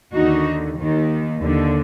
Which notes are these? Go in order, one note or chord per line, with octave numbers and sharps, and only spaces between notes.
D#2 D3 D#4 F#4
D#2 D#3
D#2 D3